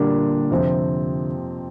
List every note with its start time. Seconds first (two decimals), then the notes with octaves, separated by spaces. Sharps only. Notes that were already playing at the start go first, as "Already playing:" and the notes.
Already playing: A#2 D3 G3 D4 A#4
0.51 F2 C3 F3 C4